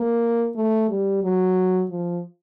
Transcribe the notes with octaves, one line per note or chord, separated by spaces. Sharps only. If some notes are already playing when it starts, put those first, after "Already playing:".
Already playing: A#3
A3
G3
F#3
F3